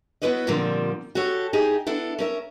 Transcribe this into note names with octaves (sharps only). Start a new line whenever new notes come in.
B3 E4 F#4 B4 C#5 D#5
A#2 D3 F3 G3 A#3 C4
F#4 G4 A4 C#5
D#4 E4 G4 G#4
B3 D4 E4 A4
C#4 A#4 E5